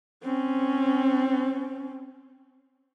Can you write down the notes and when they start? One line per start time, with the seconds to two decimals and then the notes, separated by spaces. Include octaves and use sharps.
0.23 C4 C#4